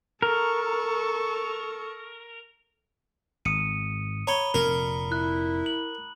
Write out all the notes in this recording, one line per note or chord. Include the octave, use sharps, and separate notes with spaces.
A4 A#4 C#6
G#1 D#6 C#7 D#7
C#5 A#5 B5 G7
F1 A#2 A#4
E4 F#6
F#7